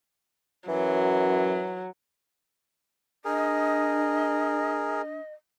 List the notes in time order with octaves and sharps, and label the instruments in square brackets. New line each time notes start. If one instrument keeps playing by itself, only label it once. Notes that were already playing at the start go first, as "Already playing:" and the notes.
[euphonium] F#2 [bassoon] E3 [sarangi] F#3
[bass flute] D4 [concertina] G#4 A#4 [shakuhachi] D#5